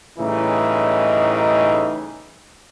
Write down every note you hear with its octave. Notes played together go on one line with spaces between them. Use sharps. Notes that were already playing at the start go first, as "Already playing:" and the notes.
A2 C#3 E3 G3 D#4